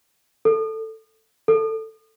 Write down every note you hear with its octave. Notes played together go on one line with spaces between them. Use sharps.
A4
A4